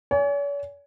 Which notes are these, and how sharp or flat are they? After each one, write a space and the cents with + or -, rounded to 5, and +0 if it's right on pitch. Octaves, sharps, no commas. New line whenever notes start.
C#5 +45 G#5 +0